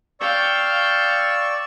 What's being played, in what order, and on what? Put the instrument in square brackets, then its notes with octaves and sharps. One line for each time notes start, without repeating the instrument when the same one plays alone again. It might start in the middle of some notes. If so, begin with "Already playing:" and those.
[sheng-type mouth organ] D5 C#6 E6 [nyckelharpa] F5 G5